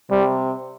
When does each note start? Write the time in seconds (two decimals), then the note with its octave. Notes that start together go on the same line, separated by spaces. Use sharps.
0.11 C3 G3